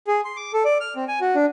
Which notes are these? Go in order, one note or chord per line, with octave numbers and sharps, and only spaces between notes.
G#4
C6
D6
A4
D5
F6
C4
G#5
F#4
D4